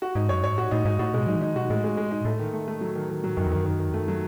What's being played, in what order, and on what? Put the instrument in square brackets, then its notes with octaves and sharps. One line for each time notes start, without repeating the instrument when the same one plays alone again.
[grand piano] F#4
[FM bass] G#2 [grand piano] D#4
[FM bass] F#2 [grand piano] C#5
[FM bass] G#2 [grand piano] C#5
[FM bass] A2 [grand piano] F#4
[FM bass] A2 [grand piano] D#4
[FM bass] G#2 [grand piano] D#4
[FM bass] A2 [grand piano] F#4
[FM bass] B2 [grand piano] G#3
[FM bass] F#3 [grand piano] D#4
[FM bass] E3
[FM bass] D#3 [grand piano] D#4
[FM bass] B2 [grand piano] F#4
[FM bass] A2 [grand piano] G#3
[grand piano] G#3
G#3
D#4
[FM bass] A2 [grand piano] A3
[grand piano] D#3
A3
A3
F#3
D#3
D#3
F#3
[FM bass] F#2 [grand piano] D#3
[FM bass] E2
[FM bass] F#2 [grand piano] D#3
[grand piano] D#3
D#3
[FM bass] E2
[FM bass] F#2 [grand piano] A3
[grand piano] F#3